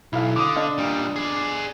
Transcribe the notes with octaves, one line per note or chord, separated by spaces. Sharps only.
B1 E4 F5
D3 D6 D#6
D4 D#5 F5
A#2 G3
G#4 D5